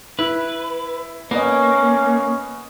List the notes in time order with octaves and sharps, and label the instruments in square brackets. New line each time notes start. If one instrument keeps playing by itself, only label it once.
[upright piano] E4 [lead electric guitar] B4
[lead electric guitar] A#3 [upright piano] B3 D#5 [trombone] C#4